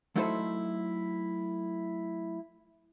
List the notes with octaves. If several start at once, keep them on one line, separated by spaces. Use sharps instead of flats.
F#3 A3 D#4 E4 A4 C5